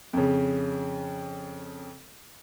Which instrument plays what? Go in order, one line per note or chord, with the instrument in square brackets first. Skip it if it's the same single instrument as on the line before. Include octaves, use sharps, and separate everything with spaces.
[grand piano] F2 C#3